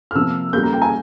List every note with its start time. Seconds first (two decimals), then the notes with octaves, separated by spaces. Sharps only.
0.11 F6
0.15 C3 F3 A#3 E6
0.53 C#3 G3 A#3 G6
0.63 A#5
0.73 G5
0.82 G#5